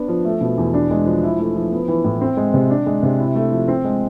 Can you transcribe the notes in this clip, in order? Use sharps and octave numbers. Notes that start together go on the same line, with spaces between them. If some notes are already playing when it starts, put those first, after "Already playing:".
Already playing: B3 D4
F3
A3
B2
E2
D4
G#3
F3
E4
A3
F3
B3
E3
A2
C4
G#3
C3
D4
G#3
C3
E4
A3
F3
C4
G#3